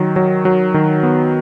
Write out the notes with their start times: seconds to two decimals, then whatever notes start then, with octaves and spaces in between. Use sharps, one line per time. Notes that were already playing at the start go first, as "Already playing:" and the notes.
Already playing: D#3 F#3
0.16 F#3
0.45 F#3
0.74 D#3
1.03 B3